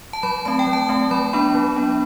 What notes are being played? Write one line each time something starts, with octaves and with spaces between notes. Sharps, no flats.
A5
F#3 B5
A3 C4 A5
G5
F#3
A5
A3 C4
F#3 B5
B3 D4 B5
F#3
B3 D4